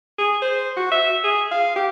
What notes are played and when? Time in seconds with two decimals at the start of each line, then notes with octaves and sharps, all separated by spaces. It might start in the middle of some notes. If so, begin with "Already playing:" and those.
0.18 G#4
0.42 C5
0.77 F#4
0.92 E5
1.24 G#4
1.52 F5
1.76 G4